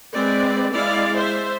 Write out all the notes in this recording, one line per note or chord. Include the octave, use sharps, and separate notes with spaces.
G#3 C4 B4 D5
G#3 E4 D5 F5
C5 E5